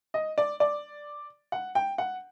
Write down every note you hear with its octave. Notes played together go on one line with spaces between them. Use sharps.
D#5
D5
D5
F#5
G5
F#5